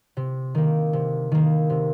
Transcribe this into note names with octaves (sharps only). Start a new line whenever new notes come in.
C3
D#3 A#3
C3
D#3 A#3
C3